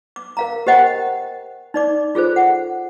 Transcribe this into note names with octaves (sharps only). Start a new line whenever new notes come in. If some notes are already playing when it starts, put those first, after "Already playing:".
D6
A#4 F5 A#5
G4 A#4 C5 D#5 F#5 G5
D#4 D5 D6
F4 G#4 A4 C5
F#5